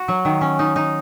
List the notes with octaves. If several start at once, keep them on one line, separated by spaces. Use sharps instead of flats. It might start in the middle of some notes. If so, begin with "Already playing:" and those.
Already playing: F#4
F#3
D#3
C#4
D#4
D#4